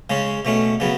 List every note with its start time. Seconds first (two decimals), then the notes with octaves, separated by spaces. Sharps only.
0.10 C#3 G#3 C#4
0.45 B2 A3 C#4
0.80 C#3 F#3 B3